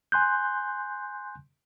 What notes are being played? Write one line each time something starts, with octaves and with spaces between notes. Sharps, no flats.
G#5 C6 F#6 G6